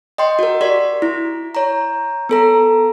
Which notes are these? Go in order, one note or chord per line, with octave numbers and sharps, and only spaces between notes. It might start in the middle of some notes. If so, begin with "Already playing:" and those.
D#5 G5 C6
F#4 A#4
G4 D5 C6 B6
E4
C#5 A#5
B3 A4 A#5